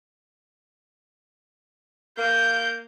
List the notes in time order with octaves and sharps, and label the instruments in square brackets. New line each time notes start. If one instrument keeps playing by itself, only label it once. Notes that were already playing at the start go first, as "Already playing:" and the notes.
[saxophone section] A#3 [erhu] G6